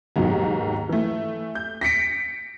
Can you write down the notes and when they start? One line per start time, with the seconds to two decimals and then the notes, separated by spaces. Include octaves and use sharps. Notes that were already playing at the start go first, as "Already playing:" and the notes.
0.16 D#2 G#2 B2 D#3 F#3
0.89 E3 A3
1.55 G6
1.81 A#6 B6 C#7 D7